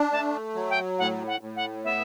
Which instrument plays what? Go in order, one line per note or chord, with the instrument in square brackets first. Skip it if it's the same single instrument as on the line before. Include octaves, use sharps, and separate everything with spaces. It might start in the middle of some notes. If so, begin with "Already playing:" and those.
Already playing: [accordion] D4
[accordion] A3 [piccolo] A5
[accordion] F#3
[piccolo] G5
[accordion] A2 [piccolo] F#5
[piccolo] F#5
[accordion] A2
[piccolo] F#5
[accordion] B3 [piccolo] E5